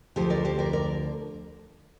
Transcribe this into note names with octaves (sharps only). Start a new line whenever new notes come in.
D2 D3 F3 G4 C5
A#4 D5
G4 C5
A#4 D5
A#4 D5